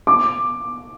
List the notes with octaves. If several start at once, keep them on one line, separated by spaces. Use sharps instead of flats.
D6